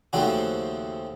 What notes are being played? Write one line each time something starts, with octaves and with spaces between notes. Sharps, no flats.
D#2 C#3 F3 A3 C4 F#4